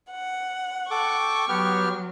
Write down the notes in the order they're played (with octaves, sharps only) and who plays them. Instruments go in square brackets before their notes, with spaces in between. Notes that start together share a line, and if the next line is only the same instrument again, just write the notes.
[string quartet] F#5
[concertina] A4 D6 [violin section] G5 C#6
[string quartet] F#3 [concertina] B3 G4 F6